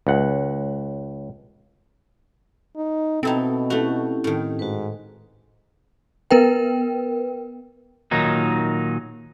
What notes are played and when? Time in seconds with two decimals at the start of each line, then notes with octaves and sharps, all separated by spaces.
0.07 C#2 F#5
2.76 D#4
3.23 B2 C4 D#4 E4 A4 G5
3.70 A3 C#4 E4 F#4 G4
4.24 A2 D#3
4.59 G#2 F#4 B4
6.31 B3 A#4 B4 G5
8.11 A#2 D#3 F#3 D#4